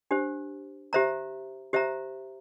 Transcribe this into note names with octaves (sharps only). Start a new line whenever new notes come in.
D4 G4 C5
G4 C5 E5 A#5
G4 C5 E5 A#5